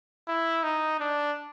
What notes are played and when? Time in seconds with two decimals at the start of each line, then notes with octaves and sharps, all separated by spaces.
0.28 E4
0.63 D#4
1.00 D4